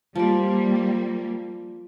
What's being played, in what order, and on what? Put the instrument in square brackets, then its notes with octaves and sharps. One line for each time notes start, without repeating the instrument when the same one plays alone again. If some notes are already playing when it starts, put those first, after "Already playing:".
[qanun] F3 D5 [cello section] G3 A#3